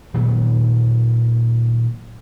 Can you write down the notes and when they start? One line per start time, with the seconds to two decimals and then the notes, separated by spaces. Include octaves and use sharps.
0.14 A#2 D#3 F#3 B3